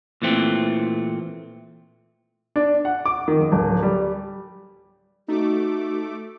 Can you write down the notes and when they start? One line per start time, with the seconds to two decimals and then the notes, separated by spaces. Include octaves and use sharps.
0.22 A#2 E3 A3 C4
2.56 D4
2.85 F#5
3.06 D6
3.28 D#3
3.39 F#1
3.52 D1
3.83 G3
5.28 A3 D#4 F#4 D6